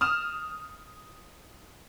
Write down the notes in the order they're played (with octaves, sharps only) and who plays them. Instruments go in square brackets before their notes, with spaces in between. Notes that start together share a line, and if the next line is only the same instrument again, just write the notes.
[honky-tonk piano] D#6 F6 E7